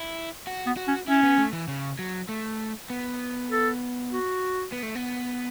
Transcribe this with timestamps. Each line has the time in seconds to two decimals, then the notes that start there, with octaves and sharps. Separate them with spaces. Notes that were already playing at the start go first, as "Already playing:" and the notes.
Already playing: E4
0.47 F#4
0.66 B3
0.77 F#4
0.87 C#4
1.07 C#4 E4
1.23 B3
1.38 A3
1.53 E3
1.68 C#3
1.99 F#3
2.29 A3
2.90 B3
3.51 A4
4.11 F#4
4.72 B3
4.83 A3
4.95 B3